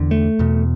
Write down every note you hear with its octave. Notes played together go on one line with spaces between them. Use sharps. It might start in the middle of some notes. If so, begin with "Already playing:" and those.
Already playing: E2 D3
A3
E2 B2